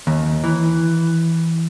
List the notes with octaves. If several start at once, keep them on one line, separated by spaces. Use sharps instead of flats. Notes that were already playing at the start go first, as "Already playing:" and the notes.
D#2
E3